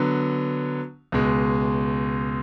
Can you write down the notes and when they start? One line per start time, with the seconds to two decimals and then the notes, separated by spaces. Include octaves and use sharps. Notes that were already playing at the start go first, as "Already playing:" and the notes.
Already playing: D3 F#3 B3
1.12 C#2 B2 G#3